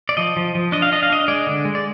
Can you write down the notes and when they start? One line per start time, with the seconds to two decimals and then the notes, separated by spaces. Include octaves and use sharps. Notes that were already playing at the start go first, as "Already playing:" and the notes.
0.09 D5
0.17 F3 D#5
0.37 F3
0.55 F3
0.72 D4 D#5
0.82 F5
0.92 D4 D#5
1.03 F5
1.10 D4 D#5
1.28 G#3 D5
1.47 D3
1.65 G#3
1.75 D5